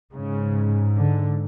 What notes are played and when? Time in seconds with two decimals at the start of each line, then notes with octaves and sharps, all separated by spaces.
0.13 G#2 C#3
0.96 D3